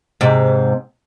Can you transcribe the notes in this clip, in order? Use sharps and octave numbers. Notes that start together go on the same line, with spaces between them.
G#2 C3